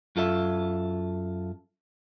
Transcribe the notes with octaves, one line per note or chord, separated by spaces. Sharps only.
F#2 F4 A4 E5